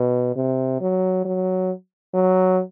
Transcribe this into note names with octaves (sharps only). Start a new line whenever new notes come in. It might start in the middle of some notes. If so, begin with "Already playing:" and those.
Already playing: B2
C3
F#3
F#3
F#3